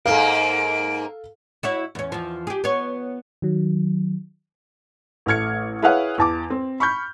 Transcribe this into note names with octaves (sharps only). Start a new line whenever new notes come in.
G#2 A#3 A4 F5 D7
E4 F#4 C#5
E2 C#4
E2 F3
G4 G#4
B3 C#5
D#3 F#3
A1 A3 F6 G#6 C#7
E4 G#4 B4 C#5 F5 F#5
E2 A5 D6
C4
B5 C#6 F6 G6